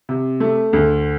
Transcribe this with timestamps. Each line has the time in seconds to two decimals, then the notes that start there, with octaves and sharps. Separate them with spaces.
0.09 C3
0.40 A3
0.73 D2